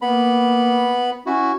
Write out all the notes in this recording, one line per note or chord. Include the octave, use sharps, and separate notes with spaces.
A#3 B3 B5
C#4 E4 F#4